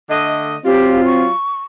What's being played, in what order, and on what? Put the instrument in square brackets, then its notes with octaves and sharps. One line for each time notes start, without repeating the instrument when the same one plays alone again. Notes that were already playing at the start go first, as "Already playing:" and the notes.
[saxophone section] D3 A3 D#5
[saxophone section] F#3 F4 [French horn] C4 [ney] G4
[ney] C#6